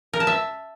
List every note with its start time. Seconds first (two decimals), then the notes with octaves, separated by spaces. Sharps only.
0.13 A#4
0.20 A5
0.27 E5